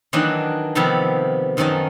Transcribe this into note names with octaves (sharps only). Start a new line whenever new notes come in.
D#3 E3 F#3 A#3 D4 D#4
C3 D#3 F3 G3 B3 A4
F#2 D#3 F3 C#4 D#4 A5